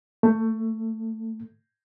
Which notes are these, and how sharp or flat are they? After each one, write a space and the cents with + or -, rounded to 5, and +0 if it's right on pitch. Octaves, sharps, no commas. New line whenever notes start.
A3 +20